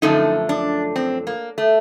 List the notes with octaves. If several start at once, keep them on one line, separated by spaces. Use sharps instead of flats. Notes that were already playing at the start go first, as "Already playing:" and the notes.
F#2 D3 F3 A3 D#4
D4
C4
A#3
A3